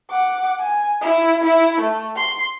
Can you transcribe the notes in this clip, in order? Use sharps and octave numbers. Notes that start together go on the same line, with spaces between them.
F#5 D6
G#5
E4
E4
A3
C6